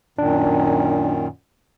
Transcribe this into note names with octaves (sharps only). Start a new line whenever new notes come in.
F#2 A#2 D#3 D4